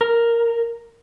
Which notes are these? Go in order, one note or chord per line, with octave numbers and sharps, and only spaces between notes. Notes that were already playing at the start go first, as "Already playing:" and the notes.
A#4